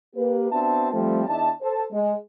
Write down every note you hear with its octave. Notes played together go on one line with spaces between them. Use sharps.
A#3 G4 B4
B3 C4 D4 F#4 E5 A5
F3 G3 A3 C4
E2 D4 D#4 E5 A5
A4 C5 A5
G#3